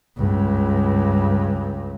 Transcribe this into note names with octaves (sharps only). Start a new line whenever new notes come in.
C#2 G2